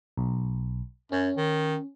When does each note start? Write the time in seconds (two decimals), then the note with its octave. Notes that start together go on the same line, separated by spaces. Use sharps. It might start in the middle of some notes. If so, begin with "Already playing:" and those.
0.17 B1
1.12 F#2 C#4
1.36 D#3